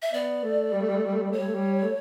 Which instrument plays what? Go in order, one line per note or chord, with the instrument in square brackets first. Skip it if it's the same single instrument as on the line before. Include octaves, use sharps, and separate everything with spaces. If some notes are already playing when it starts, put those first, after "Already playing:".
[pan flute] E5
[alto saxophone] B3 [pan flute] D5
[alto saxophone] A3
G3
A3
G3
A3
G3
A3
G3
[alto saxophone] A3 [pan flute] C#5
[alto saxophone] G3
A3
G3
A3